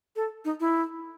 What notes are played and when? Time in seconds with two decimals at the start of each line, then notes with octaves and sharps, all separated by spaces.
0.16 A4
0.45 D#4
0.60 E4